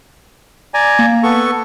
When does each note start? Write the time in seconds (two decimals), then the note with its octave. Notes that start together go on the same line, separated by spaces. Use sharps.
0.74 D5 G#5 A#5
0.99 A#3
1.23 B3 A4 C#6